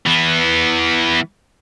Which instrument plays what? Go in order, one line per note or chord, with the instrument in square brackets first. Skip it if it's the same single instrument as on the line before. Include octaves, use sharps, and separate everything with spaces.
[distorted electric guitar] E3 B3